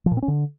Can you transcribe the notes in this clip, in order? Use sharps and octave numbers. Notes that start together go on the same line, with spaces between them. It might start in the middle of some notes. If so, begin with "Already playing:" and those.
F3
A#2
C4
C#4
D3